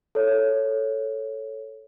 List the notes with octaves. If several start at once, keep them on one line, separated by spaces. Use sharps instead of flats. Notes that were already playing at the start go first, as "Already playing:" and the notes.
A4 C#5